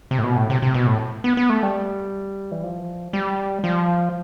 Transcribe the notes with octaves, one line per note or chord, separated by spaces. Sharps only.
C3
A2
B2
A2
C3
C3
B2
A2
B3
B3
A3
G3
E3
F3
G3
F3